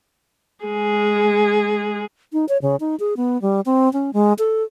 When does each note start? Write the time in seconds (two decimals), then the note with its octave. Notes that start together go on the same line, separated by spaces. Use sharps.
0.65 G#3 G#4
2.33 D#4
2.49 C#5
2.62 C#3
2.80 D#4
3.00 G#4
3.17 B3
3.42 G3
3.66 C4
3.93 C#4
4.13 G#3
4.39 A4